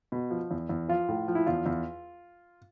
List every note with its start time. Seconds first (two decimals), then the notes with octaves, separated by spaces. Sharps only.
0.12 B2
0.31 F3
0.51 E2
0.69 E2
0.88 F3 F4
1.08 A2
1.28 F3
1.35 E4
1.46 E2 F4
1.66 E2